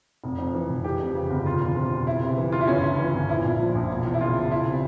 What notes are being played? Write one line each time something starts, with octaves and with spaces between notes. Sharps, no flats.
F1
F2
E3
F1
E3 G4
F2
C#3
G1
E1 F4
E2
C3
E1
C#2 E4
C3
E3
C#2 F4
E4
G1 C#4
G2
E3
G1
A#1 E4
A#2
F3
A#1
E1
E2
E4
C#3 F4
E1
C#2 E4
C3